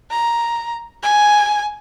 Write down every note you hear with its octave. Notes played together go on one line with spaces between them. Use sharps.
A#5
G#5